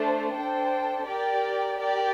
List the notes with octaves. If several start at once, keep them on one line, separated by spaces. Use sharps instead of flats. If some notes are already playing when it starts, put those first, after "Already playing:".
Already playing: A3 D4 A4 C5
D4 A4 C5 G5
G4 A#4 D5 G5
G4 A#4 D5 G5